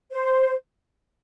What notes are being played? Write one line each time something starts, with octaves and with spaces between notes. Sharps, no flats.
C5